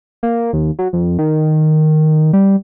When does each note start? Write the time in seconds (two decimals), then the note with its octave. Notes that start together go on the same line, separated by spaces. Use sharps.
0.23 A#3
0.53 D#2
0.79 F#3
0.93 F2
1.19 D#3
2.33 G3